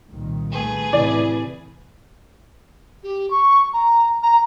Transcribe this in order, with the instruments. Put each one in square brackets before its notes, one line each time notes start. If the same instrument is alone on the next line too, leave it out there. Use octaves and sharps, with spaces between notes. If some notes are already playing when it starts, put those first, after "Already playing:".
[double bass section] C2 A#2 D#3
[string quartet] A3 G#4 B4
[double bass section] A2 [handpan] C3 E3 E4 [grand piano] D5
[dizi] G4
C#6
A#5
A#5